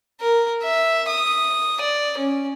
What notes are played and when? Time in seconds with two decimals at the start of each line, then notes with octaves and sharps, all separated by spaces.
0.20 A#4
0.63 E5
1.08 D#6
1.81 D5
2.17 C#4